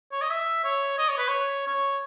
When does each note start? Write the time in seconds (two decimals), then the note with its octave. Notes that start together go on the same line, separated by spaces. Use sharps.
0.12 C#5
0.21 D#5
0.30 E5
0.64 C#5
0.98 D#5
1.09 C#5
1.18 B4
1.28 C#5
1.67 C#5